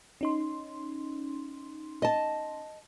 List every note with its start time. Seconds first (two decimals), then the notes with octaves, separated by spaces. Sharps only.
0.21 C#4 D#4 C6
2.02 D#5 A5